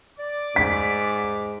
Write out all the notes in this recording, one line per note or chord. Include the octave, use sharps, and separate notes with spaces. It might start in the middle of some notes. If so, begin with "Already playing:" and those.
D5 D6
G#2 B6